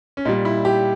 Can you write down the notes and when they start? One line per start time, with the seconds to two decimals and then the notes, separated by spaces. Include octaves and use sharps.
0.17 C#4
0.25 A#2 G3 D#4
0.45 E4
0.65 G4